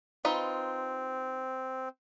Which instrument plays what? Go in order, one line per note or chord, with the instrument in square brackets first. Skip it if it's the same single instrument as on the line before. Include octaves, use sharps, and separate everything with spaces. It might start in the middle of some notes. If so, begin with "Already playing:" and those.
[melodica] C4 [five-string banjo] D#4 F4 B4